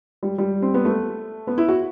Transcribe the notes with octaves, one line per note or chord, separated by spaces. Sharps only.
G3
G3
C4
B3
A3
B3
E4
F#4